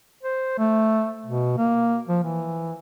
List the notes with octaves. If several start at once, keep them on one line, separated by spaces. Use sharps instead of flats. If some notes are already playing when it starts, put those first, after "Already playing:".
C5
A3
B2
A#3
F3
E3